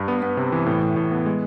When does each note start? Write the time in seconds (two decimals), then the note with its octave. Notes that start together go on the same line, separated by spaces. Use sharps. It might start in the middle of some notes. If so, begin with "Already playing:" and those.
Already playing: G2
0.08 B3
0.22 B3
0.37 C3
0.52 E3
0.66 A2
0.82 A2
0.96 A2
1.12 B3
1.26 G#3